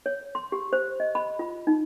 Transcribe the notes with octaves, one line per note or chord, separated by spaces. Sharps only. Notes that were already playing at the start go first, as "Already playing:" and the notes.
C#5
C6
G4
C5
D#5
B5
F4
D#4